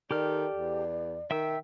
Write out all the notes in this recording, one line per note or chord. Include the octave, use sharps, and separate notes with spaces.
D#3 G4 A4 D5 F6
E2
D#3 E5 G5 E6